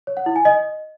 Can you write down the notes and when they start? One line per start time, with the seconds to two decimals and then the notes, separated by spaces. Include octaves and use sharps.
0.07 C#5
0.17 F#5
0.26 E4
0.36 G#5
0.45 D#5